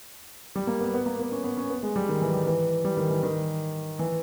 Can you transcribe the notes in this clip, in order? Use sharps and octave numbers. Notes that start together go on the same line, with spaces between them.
G3
A#3
B3
B3
A#3
B3
C#4
B3
C#4
B3
G#3
G3
D#3
E3
G3
E3
G3
D#3
E3
D#3
E3